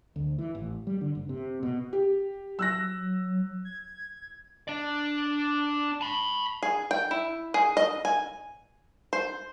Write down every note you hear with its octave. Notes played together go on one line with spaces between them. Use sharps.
D2
E3
A1
G3
D3
F#1
C3
B2
G4
F#3 E6 F#6 A#6
G#6
D4 D5
A5 B5
G#4
G5
E4
G#4
D#5
G#5
C5